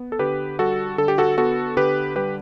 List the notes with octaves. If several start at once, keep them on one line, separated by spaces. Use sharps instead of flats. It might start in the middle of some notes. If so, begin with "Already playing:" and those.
Already playing: B3
A4
D3 G4 B4
G3 F#4 A4
D3 A4
G4
F#4 A4
B3 F#4 A4
D3 G4 B4
G3 G4 B4